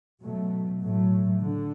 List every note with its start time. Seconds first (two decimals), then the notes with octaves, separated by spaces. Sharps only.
0.22 B2 F#3 A3
0.82 A2 F#3 A3
1.41 D3